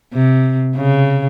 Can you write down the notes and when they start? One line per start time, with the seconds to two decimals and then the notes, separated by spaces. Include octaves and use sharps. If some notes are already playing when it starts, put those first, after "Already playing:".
0.14 C3
0.76 C#3